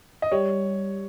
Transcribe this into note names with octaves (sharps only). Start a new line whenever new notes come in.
D#5
G3 C#5